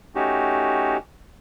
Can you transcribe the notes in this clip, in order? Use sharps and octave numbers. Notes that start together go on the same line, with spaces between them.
A3 C#4 D#4 F#4 G4